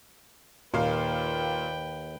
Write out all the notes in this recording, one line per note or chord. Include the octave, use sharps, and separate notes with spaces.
D#2 A#2 B4 F5 G5